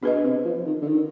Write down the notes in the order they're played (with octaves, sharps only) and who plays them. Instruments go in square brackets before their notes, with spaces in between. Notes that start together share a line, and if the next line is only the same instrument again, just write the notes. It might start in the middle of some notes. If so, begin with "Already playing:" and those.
[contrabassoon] B2 [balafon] D4 G#4 B4 D#5
[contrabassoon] C3
F3
D#3
D3
D#3